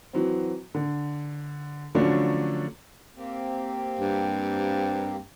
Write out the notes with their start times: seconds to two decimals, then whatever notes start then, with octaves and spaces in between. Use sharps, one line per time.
0.13 E3 F#3 C4
0.74 D3
1.95 D3 F3 F#3 A3 C#4 D4
3.16 A#3 C4 G4
3.99 G2